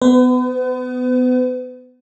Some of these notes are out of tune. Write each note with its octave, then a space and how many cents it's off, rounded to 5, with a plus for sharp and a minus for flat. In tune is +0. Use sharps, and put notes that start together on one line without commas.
B3 +20 B4 +45